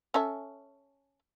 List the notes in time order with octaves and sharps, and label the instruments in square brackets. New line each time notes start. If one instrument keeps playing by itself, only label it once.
[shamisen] C#4 A4 E5